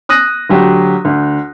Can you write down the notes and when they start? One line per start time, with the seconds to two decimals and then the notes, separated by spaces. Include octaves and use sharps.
0.09 D#6 F#6 A#6 D#7
0.49 D2 F#3 G4
1.05 D2